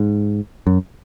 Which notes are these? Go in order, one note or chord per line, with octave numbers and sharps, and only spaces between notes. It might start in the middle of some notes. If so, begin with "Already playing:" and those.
Already playing: G#2
F#2